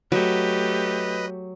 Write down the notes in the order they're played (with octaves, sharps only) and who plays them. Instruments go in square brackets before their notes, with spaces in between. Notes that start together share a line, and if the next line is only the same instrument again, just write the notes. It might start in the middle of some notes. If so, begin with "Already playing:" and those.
[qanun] F#3 [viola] A3 G4 [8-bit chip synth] B4 D#5